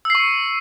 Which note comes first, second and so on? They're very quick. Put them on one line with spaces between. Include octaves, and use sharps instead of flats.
E6 C7 C#6 C#7